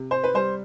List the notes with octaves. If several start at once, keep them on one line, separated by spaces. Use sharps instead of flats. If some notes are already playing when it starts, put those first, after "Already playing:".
Already playing: C3
C5
B4
G3 C5